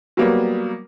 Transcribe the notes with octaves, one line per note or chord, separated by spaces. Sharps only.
F#3 G3 A#3 B3